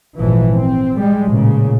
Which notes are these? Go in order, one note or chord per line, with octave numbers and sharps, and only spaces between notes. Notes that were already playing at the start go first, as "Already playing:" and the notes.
G#1 A#2 E3 F3
C4
G3 G#3
A1 A#2 C#3